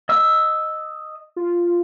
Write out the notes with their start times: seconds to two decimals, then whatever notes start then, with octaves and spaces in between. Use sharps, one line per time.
0.09 D#5 E6
1.36 F4